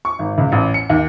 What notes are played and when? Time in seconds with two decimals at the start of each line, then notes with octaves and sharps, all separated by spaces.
0.05 C#6
0.19 G#1
0.38 C#2
0.52 A1
0.74 C#7
0.90 D#2